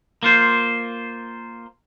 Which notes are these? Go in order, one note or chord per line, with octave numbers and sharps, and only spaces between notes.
A#3 F4 C5